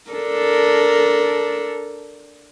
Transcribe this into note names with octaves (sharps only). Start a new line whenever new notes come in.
D4 A4 A#4